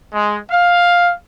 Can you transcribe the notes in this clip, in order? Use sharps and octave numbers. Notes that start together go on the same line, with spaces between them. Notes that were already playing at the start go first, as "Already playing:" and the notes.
G#3
F5